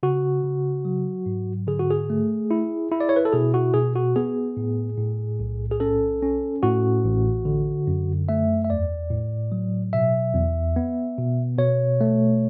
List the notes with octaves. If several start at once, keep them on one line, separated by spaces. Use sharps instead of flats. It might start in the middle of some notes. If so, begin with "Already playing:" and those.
C#3 F#4
C#3
F#3
G#2
D3 G#4
F#4
G#4
A3
E4
E4
D5
C#5
B4
A4
B2 G#4
F#4
B2 G#4
F#4
B3 G#4
A2
A2
B1
G#4
C#4 A4
C#4
A2 F#4
A1
D3
F#2
A3 E5
E5
E2 D5
A2
F#3
B2 E5
E2
B3
B2
B2 C#5
A3